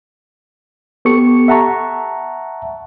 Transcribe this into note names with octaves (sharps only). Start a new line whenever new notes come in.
B3 G4 A4 C#6 C#7
E5 F#5 A5 A#5 C#6